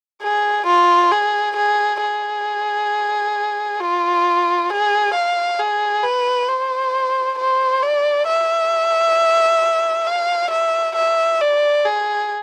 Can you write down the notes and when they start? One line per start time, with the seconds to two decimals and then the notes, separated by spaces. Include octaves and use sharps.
0.23 G#4
0.67 F4
1.12 G#4
1.57 G#4
2.02 G#4
3.80 F4
4.70 G#4
5.14 F5
5.59 G#4
6.04 B4
6.49 C5
7.39 C5
7.83 D5
8.27 E5
10.07 F5
10.51 E5
10.96 E5
11.41 D5
11.85 G#4